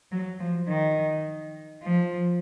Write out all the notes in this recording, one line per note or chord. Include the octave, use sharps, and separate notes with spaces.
F#3
F3
D#3
F3